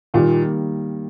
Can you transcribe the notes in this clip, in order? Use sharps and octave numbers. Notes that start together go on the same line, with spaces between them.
A#2 D#3 G3 A#3